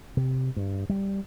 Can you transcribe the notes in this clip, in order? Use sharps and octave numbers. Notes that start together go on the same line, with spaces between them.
C3
G2
G3